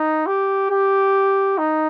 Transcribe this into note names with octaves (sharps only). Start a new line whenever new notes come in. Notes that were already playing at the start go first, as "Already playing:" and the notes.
Already playing: D#4
G4
G4
D#4